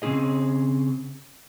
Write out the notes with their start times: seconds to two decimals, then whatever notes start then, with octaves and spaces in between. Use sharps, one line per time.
0.02 C#3 C4 C#4 E4 G#4 D#5